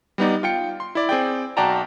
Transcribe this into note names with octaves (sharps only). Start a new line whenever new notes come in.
G3 B3 D#4 D5
F4 G5 C#7
C6
E4 D5
C4 G#4 D5 G5
B1 F#4 D5 G5 A5 A#5